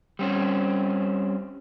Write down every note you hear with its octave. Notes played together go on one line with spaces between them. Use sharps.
G3 C4 C#4